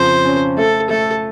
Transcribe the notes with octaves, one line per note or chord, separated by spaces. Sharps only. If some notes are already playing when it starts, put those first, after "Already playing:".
Already playing: F2 C#3 C5
C#4
A3 A4
A3 A4